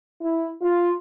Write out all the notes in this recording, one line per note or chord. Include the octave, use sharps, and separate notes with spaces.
E4
F4